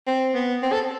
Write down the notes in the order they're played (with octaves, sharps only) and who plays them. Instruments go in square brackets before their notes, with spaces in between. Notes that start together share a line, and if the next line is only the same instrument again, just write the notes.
[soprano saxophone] C4
B3
C4
A4